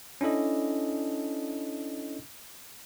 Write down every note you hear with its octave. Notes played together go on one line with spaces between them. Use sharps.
C#4 D4 E4 A4 D#5